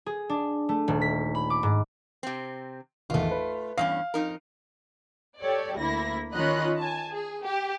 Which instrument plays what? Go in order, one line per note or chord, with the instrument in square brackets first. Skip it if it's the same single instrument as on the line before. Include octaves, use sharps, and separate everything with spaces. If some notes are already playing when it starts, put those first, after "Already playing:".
[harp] G#4
D4
A3
D#1
B6
B5
D6
G#2
[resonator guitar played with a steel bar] C3 C4
[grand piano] G#1 E2 [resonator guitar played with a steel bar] A3 F4
[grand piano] B4
[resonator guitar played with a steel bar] E2 G2 C#4 [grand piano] F5
[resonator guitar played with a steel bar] F2 D#4 A#4
[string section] G4 A4 C#5 D5
D2 A#3 E4 A#6
D#3 C#4 F4 D#5 B5 F#6
G#5 A5
G#4
G4